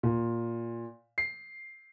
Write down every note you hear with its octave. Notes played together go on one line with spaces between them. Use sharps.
A#2
C7